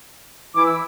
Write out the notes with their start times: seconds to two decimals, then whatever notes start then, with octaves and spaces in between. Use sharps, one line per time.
0.55 E3 E4 D6
0.66 E6